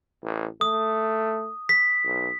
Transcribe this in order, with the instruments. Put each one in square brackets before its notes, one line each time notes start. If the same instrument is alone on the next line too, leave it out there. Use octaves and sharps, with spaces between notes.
[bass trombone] A1
[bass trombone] A3 [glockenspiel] D#6
[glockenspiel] B6
[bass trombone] B1